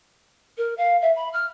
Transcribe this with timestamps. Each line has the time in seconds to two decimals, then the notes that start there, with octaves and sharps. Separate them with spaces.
0.57 A#4
0.78 F5
1.02 E5
1.16 B5
1.33 F6